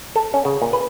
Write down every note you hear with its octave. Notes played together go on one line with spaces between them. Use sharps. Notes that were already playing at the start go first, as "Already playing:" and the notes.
A4
C#4
C#3
A#2
B4